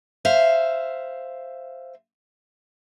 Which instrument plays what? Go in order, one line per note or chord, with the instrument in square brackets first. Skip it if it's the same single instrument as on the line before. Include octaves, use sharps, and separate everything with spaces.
[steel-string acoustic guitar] C5 E5 F5